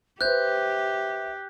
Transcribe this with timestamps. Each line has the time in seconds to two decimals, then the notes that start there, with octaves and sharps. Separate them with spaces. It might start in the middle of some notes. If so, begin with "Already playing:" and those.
0.21 G4 B4 C5 E5 F#6 G6